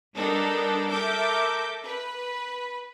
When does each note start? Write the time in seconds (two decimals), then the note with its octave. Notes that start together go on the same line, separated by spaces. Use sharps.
0.16 G3 B3 D4 D#4 A4 A#4
0.89 A4 A#4 E5 D6 G6
1.84 B4